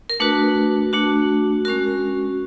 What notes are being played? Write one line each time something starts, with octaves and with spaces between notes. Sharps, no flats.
A#4
A3 D4 F#4 B4
A3 D4 F#4
G#3 C#4 F#4 A#4